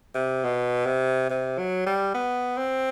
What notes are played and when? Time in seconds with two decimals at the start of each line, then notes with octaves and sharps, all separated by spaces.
0.15 C3
0.44 B2
0.86 C3
1.30 C3
1.58 F#3
1.86 G3
2.14 B3
2.58 C4